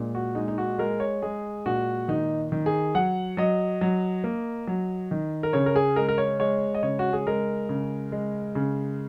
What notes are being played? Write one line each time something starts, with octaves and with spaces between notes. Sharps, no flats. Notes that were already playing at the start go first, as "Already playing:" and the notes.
Already playing: A#2 G#3
F#4
G#3 D#4
D#4
F#4
G#3 A#4
C#5
G#3 G#4
A#2 F#4
D#3 D#4
D#3
G#4
F#3 F#5
F#3 D#5
F#3
A#3
F#3
D#3
A#4
C#3 C#5
A#4
G#4
G#3 A#4
A#4
C#5
G#3 C#5
D#5
C#3 C#5
F#4
G#4
G#3 A#4
C#3
G#3
C#3